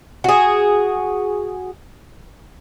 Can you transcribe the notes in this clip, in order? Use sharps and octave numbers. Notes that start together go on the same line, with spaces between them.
F#4 G#4